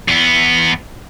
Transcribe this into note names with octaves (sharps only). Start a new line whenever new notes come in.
E2 B3